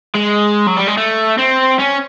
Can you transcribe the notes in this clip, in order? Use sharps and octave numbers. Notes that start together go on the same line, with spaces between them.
G#3
F#3
G3
G#3
A3
C4
C#4